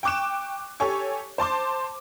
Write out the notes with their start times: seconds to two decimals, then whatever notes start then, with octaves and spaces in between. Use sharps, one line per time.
0.03 G5 C#6 D6 F#6 E7
0.80 G4 A4 C#5 G#5 C#6
1.38 C5 A5 C6 D6